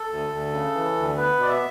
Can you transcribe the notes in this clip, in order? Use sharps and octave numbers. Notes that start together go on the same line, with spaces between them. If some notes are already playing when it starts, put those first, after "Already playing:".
Already playing: A4
D2
D2
C#3
E3
D2
B3 B4
B2 D5
E5